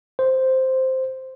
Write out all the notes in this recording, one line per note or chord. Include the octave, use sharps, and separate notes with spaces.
C5